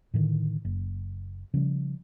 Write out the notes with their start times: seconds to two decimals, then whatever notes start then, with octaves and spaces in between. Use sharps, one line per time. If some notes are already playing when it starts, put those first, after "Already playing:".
0.14 A2 D3 D#3
0.65 F#1
1.54 C#3 F3 G3